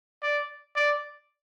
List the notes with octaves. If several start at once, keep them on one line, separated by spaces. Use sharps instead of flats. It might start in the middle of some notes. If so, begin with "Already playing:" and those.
D5
D5